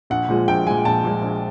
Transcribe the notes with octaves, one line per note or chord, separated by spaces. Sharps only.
A#1 F#5
A#2 F3 G#3
A#1 G5
A#2 F3 G#3 G#5
A#1 A5
A#2 F3 G#3
A#1